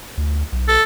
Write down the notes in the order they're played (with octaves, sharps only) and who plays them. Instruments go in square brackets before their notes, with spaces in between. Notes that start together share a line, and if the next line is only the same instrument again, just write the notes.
[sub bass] D2
B1
[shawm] A4